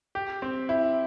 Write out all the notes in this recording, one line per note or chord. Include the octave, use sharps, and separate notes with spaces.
G4
C4
E4